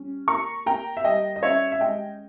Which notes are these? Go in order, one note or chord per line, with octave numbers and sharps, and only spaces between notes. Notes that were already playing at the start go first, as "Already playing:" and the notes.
Already playing: G3 C#4
A#3 A#5 C#6
A#3 G5 A#5
E5
G3 D#5 G5
D#5
C#4 C#5 E5
E5
G#3 D#5 G5